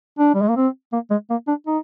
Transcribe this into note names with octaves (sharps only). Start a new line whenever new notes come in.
D4
G3
G#3
A#3
C4
A#3
G#3
A#3
D4
D#4